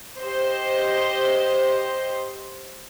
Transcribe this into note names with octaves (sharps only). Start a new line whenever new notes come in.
G4 C5 D#5